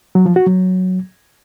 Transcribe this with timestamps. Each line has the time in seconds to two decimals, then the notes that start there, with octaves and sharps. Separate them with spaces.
0.15 F#3
0.26 F3
0.36 F#4
0.47 F#3